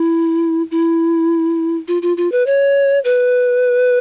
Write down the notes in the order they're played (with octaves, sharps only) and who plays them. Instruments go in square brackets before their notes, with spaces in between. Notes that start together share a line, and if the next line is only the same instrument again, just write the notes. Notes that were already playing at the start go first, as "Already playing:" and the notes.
Already playing: [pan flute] E4
E4
F4
F4
F4
B4
C#5
B4